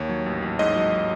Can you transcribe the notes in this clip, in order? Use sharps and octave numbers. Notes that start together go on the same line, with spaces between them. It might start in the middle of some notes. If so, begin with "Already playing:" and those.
Already playing: D#2 C#5
F#3
A1
A1
G#2 D#5
F#3